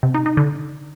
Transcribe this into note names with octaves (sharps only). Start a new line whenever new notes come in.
C3
D#4
D#4
D3